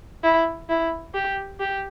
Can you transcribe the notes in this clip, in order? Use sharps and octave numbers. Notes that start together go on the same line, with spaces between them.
E4
E4
G4
G4